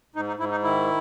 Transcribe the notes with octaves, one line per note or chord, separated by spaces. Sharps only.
G#2 D#4
D#4
G#2 E4
D#4
D#3 E4